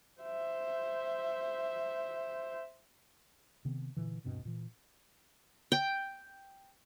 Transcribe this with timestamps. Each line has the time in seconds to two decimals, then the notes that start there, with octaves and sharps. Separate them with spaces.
0.21 C5 E5
3.65 C3 D#3 B3 C4
3.97 A#2 D3 E3
4.24 D#1 G2 B2 C4
4.45 A#2 E3
5.72 G5